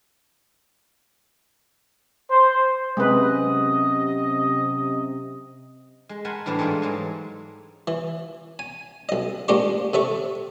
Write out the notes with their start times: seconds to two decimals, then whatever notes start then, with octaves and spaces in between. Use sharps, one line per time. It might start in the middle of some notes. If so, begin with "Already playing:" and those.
2.30 C5
2.97 C3 F#3 G#3 C#4 B4 D#5 D#6
6.09 G#3
6.25 A#4 F#5 G#5 A5 B5 C6
6.46 A2 E3 G3 D4 C5
6.59 G#2 A3 D#4 F4 G#4
6.82 E3 F#3 G#3
7.87 E3
8.59 G#5
9.09 B1 D#5
9.48 A#2 G#3 D4 G4 C5 C#6
9.93 C3 C4 A4 E5 C#6